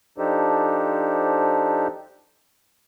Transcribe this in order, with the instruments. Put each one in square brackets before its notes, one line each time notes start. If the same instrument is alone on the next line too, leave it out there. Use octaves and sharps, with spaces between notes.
[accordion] F3 D4 D#4 G4 A4 C5